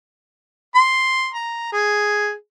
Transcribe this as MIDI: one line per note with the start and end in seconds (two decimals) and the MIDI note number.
0.75 1.29 84
1.34 1.72 82
1.73 2.33 68